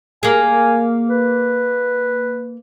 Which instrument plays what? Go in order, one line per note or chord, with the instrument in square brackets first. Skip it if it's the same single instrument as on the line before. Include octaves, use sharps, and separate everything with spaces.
[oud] A#3 G#4 [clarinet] G#5
[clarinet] B4